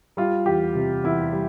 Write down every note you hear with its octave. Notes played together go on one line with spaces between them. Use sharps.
G3 F4
E2 G4
C3
E2 E4
G3